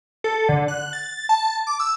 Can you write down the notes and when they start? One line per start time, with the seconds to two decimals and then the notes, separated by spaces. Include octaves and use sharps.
0.24 A4
0.49 D3
0.68 F#6
0.93 A6
1.29 A5
1.67 D6
1.80 E6